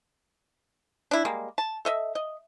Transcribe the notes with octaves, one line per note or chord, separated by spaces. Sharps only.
D4 E4
G3 G#3 A#3
A5
A4 D#5 E5
D#5